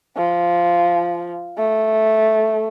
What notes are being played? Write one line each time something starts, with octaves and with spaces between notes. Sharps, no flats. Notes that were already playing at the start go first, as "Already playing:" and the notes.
F3
A3